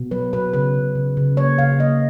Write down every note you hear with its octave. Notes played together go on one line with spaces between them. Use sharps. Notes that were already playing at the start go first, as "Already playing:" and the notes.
Already playing: B2
F#3 B4
B2 B4
C#3 B4
C#3
C#3
C#3
A#3 C#5
C#3 F5
A#3 D#5